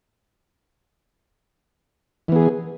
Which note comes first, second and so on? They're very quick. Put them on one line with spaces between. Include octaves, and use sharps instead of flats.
E3 B3 G#4